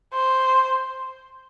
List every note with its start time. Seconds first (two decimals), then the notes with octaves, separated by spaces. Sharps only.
0.14 C5